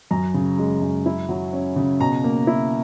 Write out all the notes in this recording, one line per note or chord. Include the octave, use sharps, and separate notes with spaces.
F#2 A#5
C#3
G#3
F#2
E4
F#3
C#4
C#3
B2 A#5
A#3
E4